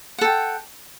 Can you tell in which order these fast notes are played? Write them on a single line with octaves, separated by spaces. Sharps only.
F#5 A4 G5